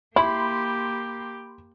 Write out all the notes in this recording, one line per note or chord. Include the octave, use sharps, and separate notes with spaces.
A#3 E4 G4 B5 C6